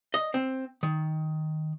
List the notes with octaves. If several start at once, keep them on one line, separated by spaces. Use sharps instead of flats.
D#5
C4
D#3